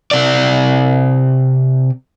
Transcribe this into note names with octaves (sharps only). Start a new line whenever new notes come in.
C3 D5